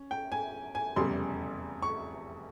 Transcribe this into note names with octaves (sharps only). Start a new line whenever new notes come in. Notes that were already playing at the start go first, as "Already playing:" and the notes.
Already playing: C#4
G5
G#5
G#5
F1 E2 C#3 G3 C6
C#6